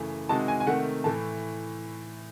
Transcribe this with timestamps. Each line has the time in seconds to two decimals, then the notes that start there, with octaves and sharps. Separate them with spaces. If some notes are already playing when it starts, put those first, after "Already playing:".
Already playing: F#2 C#3 E3 A3
0.29 C3 D#3 G#3 D#4 F#4 A5
0.48 G#5
0.60 G#5
0.66 C3 D#3 A3 F#5
1.04 A2 E3 A3 A5